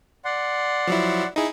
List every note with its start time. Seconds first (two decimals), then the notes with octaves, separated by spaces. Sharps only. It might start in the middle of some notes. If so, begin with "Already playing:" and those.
0.25 D5 F#5 C6
0.88 F3 F#3 E4
1.36 D#4 E4 G#4